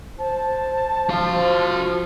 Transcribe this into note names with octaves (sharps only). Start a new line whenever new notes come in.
C5 A5
F3 F#4 F5